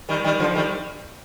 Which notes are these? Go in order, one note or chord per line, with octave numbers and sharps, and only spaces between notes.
D#3 G3
D#3 G3
D3 F3
D#3 G3